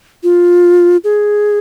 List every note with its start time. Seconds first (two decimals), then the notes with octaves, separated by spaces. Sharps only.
0.23 F4
1.04 G#4